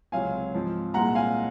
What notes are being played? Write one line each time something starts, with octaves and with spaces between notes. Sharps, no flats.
C#2 C3 F#3 C4 F5 G#5
G#2 F3 C4
C2 A#2 G#3 C4 F#5 A#5
F5 G#5